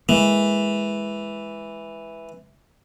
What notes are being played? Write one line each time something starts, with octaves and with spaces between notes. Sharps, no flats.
E3 G#3 A#3